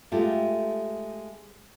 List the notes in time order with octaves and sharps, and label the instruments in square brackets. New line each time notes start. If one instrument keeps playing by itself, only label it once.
[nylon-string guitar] G#3 A3 F4 G4